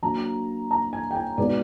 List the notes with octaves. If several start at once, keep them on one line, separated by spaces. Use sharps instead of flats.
F#3 A#3 D4 A#5
A#5
G#5
G5
G#5
B2 G#3 B3 D#4 D5